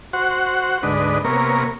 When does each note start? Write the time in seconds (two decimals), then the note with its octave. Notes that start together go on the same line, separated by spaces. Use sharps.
0.13 F#4 C5 F#5
0.83 D2 G#2 D4 B4 D#5
1.24 C3 A#3 B3 A#4 C#5